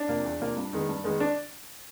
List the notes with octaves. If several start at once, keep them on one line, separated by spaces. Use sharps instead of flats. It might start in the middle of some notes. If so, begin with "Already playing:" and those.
Already playing: D4
C3 F3 A#3
E2
C3 F3 A#3
G2
D#3 G#3 B3
G2
D#3 G#3 B3
D4